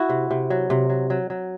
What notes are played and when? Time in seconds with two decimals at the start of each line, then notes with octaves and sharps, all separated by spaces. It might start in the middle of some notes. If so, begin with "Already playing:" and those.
Already playing: E4 F#4
0.09 C3
0.31 C3
0.50 F#3
0.70 C3
0.90 F#3
1.10 F#3
1.30 F#3